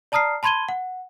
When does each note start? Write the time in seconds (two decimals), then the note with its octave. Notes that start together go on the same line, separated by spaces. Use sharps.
0.12 D5 A5 A#5 D#6 F6 C7
0.43 A5 B5 C6 G#6 D#7 G7
0.69 F#5